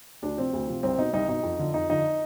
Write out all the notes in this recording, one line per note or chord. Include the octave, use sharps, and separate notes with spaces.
D2 D4
C3 F3 C4
D2
C3 F3
C2 C4
B2 D#4
C2 D#4
B2 D#4
F2
D3 F3
F2 D#4
D3 F3 D#4